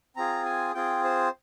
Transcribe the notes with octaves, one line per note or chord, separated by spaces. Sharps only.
C4 F4 G#4 A#5
G#5
C4 F4 G#4 G5
C5